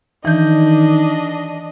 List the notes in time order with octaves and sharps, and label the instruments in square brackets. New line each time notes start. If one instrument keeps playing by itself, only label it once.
[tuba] D#3 [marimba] E3 G6 [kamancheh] D4 D#5